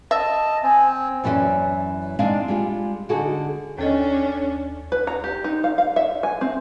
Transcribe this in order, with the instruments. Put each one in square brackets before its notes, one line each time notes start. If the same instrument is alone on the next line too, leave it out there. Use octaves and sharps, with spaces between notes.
[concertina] D#5 A5 [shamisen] E5
[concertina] C4 [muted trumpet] G#5
[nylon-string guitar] F#2 E3 C#4 G#4 D5 G#5
G#3 C4 D4 D#4 D5 F5
G3 G#3 F4
D3 D#4 F#4 G#4 A4
[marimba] D#2 A4 D#5 [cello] C#4 D4
[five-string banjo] B4
A#5
G4
D#4
F5
F5
E5
G#5
C4